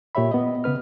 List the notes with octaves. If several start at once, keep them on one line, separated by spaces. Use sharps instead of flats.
A#2 G4 C#5 E5 B5
B3 D#5
C#3 B3 B4 F6